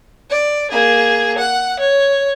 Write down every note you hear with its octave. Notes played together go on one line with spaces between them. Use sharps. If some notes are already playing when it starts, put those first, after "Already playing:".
D5
A#3 G#4
F#5
C#5